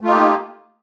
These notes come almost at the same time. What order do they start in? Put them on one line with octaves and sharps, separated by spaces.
A3 F4 D#4 G4 A#3